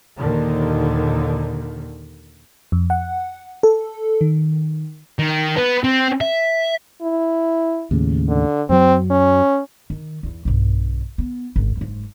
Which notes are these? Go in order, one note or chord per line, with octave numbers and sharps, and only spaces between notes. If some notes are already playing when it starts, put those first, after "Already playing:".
D#2 A#2 D3 D#3
F2
F#5
A4
D#3
D#3
B3
C4
E5
E4
D#2 A2 C#3
D3
F#2 F#3 C4
C#4
D#3
E2 E3
B1 G2
B3
G#1 C#4
F#1 G#2